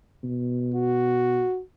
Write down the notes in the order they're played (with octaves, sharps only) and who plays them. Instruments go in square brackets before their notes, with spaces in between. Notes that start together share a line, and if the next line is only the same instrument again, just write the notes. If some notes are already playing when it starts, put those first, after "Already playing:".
[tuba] B2
[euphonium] F#4